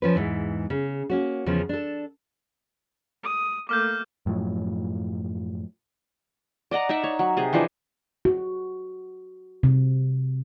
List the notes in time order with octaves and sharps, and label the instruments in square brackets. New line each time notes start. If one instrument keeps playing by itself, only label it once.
[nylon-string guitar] F3 C#4 B4
E2 G#2 E3
C#3
A#3 C#4 F#4
E2 C#3 F3 B3 C#4
D4 A4
[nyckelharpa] D#6
[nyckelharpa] A3 A#3 [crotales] D6 F6 G6
[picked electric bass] F#2 A2 F3 F#3
[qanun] D5 D#5 F#5 A#5
D#4 D5 E5 F#5
C#5
F#3
C3 G#4
E3 F3 D4 D#4
[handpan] F#4
C3